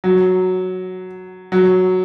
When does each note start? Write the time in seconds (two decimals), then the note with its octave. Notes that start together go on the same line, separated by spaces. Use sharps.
0.04 F#3
1.52 F#3